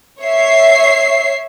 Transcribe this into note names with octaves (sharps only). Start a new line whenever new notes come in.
C#5 E5 C7